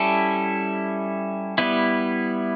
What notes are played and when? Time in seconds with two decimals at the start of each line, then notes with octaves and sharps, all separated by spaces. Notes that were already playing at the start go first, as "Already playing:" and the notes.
Already playing: G3 C#4 E4 A4
1.58 G3 B3 E4